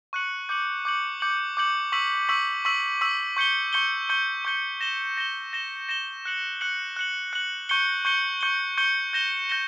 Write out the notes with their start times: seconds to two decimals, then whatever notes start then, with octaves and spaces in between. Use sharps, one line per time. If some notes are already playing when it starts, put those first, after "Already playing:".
0.13 C#6 F#6 C#7 F#7
0.49 D6 G6 C#7 F#7
0.85 D6 G6 C#7 F#7
1.20 D6 G6 C#7 F#7
1.57 D6 G6 C#7 F#7
1.92 C#6 E6 B6 F#7
2.29 C#6 E6 B6 F#7
2.65 C#6 E6 B6 F#7
3.01 C#6 E6 B6 F#7
3.37 C#6 G6 C#7 G7
3.73 C#6 G6 C#7 G7
4.09 C#6 G6 C#7 G7
4.45 C#6 G6 C#7 G7
4.80 A#6 E7 G7
5.17 A#6 E7 G7
5.53 A#6 E7 G7
5.89 A#6 E7 G7
6.25 F#6 C#7 F#7
6.61 F#6 C#7 F#7
6.96 F#6 C#7 F#7
7.33 F#6 C#7 F#7
7.69 C#6 G6 C#7 G7
8.05 C#6 G6 C#7 G7
8.41 C#6 G6 C#7 G7
8.78 C#6 G6 C#7 G7
9.13 G6 A#6 E7 G7
9.49 G6 A#6 E7 G7